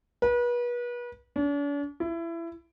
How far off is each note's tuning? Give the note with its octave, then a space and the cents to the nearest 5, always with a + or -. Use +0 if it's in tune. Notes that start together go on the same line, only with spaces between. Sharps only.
B4 -35
D4 -45
E4 +25